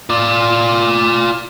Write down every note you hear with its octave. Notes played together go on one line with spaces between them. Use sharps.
F4 D5